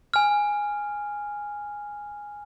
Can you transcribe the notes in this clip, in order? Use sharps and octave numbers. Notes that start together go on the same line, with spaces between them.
G#5 F6